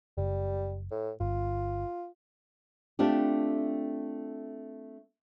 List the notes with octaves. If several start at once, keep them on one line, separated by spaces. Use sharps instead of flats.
F#1 G3
A2
G1 F4
A3 C4 D4 F4 G4